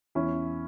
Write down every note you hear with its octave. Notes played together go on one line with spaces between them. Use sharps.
E2 C#4 E4